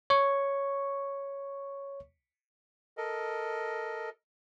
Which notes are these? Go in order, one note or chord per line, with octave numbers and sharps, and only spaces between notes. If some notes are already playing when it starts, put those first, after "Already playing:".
C#5 C#6
A4 A#4 D#5